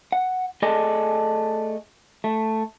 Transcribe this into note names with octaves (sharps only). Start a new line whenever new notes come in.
F#5
A3 G#4 A4 D5 D#5 G#5
A3